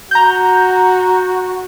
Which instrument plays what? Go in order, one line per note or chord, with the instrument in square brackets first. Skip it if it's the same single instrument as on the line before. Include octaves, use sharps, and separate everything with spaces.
[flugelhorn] F#4 [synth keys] A#5 G6